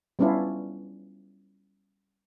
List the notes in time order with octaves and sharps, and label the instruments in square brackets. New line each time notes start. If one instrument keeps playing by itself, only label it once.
[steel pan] G3 B3 C#4 D4 E4 F4